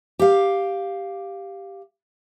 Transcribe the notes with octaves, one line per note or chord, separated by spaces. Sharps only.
G4 F5